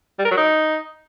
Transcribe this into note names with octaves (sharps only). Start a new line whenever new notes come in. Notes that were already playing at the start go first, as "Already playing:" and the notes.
G3
A#4
F#3
D#4